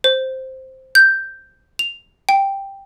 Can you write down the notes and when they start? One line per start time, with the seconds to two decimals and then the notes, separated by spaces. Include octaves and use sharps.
0.04 C5
0.95 G6
1.79 F7
2.29 G5